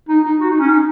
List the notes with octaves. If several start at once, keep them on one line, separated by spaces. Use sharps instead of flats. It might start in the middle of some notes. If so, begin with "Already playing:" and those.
D#4
D#4
F#4
D#4
C#4
D#4